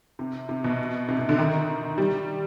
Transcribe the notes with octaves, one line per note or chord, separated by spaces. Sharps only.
C3
C3
B2
C3
C3
D3
D#3
G3